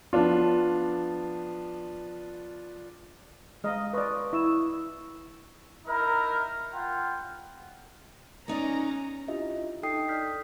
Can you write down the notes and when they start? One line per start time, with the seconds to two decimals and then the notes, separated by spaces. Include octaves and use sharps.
0.13 F3 B3 D4 F4
3.64 G#3 D#5 F5 A#5 F6
3.93 B4 D5 C6 C#6 D#6
4.33 E4 C#6 E6 E7
5.85 D#4 E4 A#4
6.73 F4 F#5 G5
8.48 B3 C#4 D#4 D5 A#5
9.28 D4 E4 F4 G4 D#5 E5
9.83 D#4 A4 D#5 G5 D#6 C7
10.08 D5 D#6 F6 G6 B6